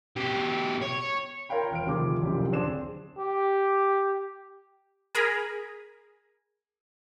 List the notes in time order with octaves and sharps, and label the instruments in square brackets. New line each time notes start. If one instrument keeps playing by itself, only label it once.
[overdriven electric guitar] B2 G4
C#5
[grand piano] F4 A#4 C#5 F5 G5 B5
E1 F6 D7
D2 C3 D#3 F3 G#4 D6
F1 C2 F#2 A#2 F3 G4
D1 C4 D4 G#4 D6 E7
[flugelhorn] G4
[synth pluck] G#4 A#4 G#5 A#5 B5